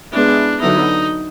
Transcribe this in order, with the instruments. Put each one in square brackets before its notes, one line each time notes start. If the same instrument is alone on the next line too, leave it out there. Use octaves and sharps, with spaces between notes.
[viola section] G#3 B3 E4 [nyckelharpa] D4
[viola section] D3 F#3 B3 E4 [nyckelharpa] D#4